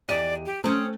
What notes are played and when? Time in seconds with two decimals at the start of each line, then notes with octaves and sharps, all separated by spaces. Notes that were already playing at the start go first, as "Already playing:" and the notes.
0.09 E2 G4 D5 D#5 D#7
0.46 G4
0.64 A3 C4 C#4 D#6